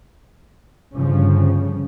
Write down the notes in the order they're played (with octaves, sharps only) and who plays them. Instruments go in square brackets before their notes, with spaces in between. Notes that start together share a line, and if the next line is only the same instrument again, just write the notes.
[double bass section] G1 G2 C#3 F3 C#4